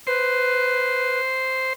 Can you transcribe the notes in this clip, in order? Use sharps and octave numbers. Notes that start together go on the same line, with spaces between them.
B4 C5